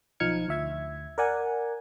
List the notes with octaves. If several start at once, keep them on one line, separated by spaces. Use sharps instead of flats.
B1 F3 D#4 F6 G#6 C#7
D2 E5 G#6
A#4 D5 F#5 G#5